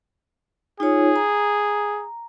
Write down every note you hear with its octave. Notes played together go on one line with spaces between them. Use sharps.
D#4 F4 G#4 C#5
A#5